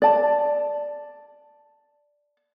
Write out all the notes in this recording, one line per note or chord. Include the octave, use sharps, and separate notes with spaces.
D5 A5